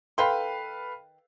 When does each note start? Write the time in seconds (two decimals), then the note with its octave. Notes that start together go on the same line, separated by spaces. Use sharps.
0.18 D#3 A4 B4 F5 G5 C6